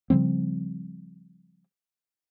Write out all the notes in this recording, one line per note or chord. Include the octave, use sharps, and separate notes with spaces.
C#3 F3 G3 C4